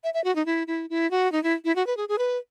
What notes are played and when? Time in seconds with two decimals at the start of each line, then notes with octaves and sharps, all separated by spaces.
0.04 E5
0.14 E5
0.24 F#4
0.36 D#4
0.46 E4
0.67 E4
0.90 E4
1.11 F#4
1.32 D#4
1.44 E4
1.65 E4
1.76 F#4
1.87 B4
1.97 G#4
2.09 G#4
2.18 B4